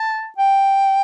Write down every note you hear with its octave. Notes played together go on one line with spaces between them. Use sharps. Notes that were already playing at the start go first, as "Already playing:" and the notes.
Already playing: A5
G5